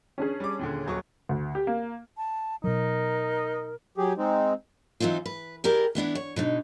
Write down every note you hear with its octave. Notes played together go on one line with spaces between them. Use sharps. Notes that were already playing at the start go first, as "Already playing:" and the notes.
C#4 D4 G#4
G3 D6
D#2 A#2 D3
D#1 F#3 C#6
D2
G4
A#3
A5
B2 F#3 D#4 A#4
F#3 G4 G#4
G#3 C4 D#4
E3 F#3 C4 D#4 F4
B4
E4 G4 G#4 A#4 D5
E3 B3 D4 E4
C#5
B2 D3 D#4